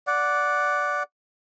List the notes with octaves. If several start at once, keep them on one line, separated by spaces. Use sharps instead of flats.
D5 F#5